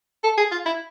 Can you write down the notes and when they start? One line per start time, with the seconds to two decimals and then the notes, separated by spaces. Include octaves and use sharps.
0.24 A4
0.38 G#4
0.51 F4
0.66 E4